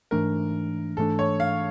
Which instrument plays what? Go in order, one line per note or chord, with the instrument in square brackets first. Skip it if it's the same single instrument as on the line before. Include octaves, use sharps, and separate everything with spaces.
[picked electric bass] G#2 E3 A3 D4 [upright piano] A#4
[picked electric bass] G#2 E3 A3 D4 [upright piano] A4
[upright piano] C#5
F5